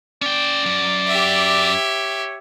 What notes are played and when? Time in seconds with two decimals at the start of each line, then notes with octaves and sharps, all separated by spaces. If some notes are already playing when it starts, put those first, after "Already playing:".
0.22 C#4 D5 G5
0.66 F#2
1.08 G4 E5
1.74 C#5